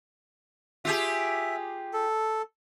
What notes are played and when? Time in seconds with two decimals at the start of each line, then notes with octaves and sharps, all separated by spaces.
0.85 F4 G4 G#4 E5
1.93 A4